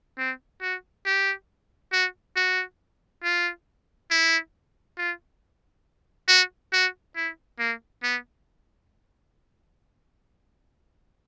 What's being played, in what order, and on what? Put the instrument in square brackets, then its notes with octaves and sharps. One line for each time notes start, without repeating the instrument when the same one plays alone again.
[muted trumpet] C4
F#4
G4
F#4
F#4
F4
E4
F4
F#4
F#4
E4
A#3
B3